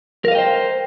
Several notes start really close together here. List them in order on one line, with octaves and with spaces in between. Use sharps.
A#4 F5 D#5 G5 C5